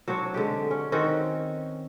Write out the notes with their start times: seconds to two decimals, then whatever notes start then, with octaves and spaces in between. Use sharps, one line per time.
0.08 F#3 C4 D4 C#5
0.34 D3 G#3 G4
0.71 C#4
0.92 D#3 C4 C#4 F#4